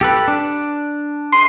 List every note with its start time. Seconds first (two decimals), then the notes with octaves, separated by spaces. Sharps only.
0.01 G4 A4 B4
0.28 D4
1.32 C6